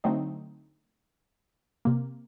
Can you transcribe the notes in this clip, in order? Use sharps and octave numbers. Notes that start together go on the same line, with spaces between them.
D3 F#3 A3 C4 D#4
C3 A#3